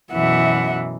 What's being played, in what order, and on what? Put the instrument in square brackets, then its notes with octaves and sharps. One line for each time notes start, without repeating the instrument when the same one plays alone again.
[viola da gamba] F#2 B2 E3 [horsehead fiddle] E5 F#5